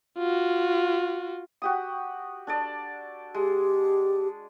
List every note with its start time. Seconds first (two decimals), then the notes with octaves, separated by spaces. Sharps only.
0.18 F4 F#4
1.62 F#4 G4 D#6
2.47 D4 A4 D5
3.35 G#3 G4